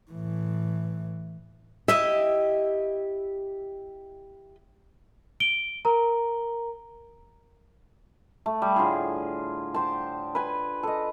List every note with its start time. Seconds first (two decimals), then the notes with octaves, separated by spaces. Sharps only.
0.11 A2 E3
1.88 E4 G4 D#5 E5
5.40 D7 G7
5.85 A#4 A#5
8.46 A3
8.62 G3
8.76 A2 D3 F4 G#4
9.74 G4 C5 A5
10.35 B4 G#5
10.83 A4 D#5